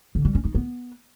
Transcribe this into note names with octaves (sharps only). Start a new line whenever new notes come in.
D3
G3
C#4
D#4
B3